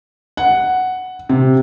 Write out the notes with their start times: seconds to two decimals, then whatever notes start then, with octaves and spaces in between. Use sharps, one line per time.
0.37 F#5
1.29 C3